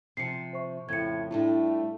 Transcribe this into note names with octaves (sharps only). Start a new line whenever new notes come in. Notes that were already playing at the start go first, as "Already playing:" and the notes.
C3 F3 C7 C#7
C5 E5 C#6
F2 A2 C#3 G#6 C#7
A2 G3 A3 D4 E4 F4